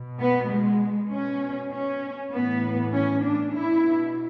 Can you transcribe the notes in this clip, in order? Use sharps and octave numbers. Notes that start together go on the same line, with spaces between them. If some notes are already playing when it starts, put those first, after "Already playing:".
Already playing: B2
B3
G#3
B2 C#4
C#4
A2 E3 B3
C#4
D4
B2 E4